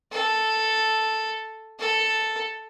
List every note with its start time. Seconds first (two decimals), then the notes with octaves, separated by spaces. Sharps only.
0.12 A4
1.79 A4